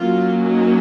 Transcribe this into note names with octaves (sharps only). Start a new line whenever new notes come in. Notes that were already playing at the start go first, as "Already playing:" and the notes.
Already playing: F#3 A#3 C#4 F4
D#4